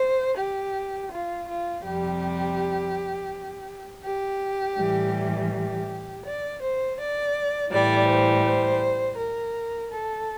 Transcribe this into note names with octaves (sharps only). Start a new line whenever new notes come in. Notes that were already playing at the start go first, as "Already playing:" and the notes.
Already playing: C5
G4
F4
F4
F2 C3 G3 G4
G4
A2 E3 G3
G4
D5
C5
D5
A2 E3 G3 D5
C5
C5
A#4
A4